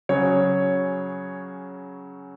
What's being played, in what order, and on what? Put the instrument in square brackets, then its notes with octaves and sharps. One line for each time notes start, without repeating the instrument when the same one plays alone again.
[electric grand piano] C#3 F#3 C#4 G#4 [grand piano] C#5